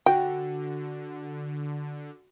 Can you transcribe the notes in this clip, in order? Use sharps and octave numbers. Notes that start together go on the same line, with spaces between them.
D3 F#4 G5